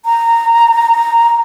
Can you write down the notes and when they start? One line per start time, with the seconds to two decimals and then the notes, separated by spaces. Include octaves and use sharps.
0.05 A#5